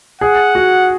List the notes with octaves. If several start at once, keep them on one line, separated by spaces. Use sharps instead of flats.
G#4 F#5
F#4